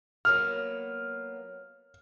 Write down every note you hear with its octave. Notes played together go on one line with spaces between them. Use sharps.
F#3 A#3 B3 F6